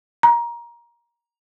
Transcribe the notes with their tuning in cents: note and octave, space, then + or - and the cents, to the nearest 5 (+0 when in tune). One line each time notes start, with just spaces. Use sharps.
A#5 +20